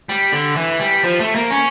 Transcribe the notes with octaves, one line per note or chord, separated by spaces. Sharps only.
G3
D3
E3
G3
F3
A3
A#3
C#4